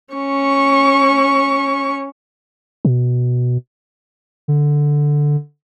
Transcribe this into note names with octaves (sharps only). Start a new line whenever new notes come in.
C#4 C#6
B2
D3